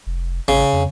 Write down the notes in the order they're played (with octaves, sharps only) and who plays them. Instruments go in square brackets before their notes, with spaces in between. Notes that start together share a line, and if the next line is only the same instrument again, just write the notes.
[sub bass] F1
[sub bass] A1 [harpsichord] C#3
[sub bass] F2